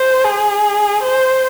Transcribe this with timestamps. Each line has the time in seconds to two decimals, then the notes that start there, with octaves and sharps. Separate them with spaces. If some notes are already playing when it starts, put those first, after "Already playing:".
Already playing: C5
0.24 G#4
1.03 C5